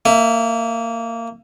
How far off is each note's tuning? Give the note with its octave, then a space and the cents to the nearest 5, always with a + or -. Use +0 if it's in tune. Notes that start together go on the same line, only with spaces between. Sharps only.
A#3 -20 E5 +0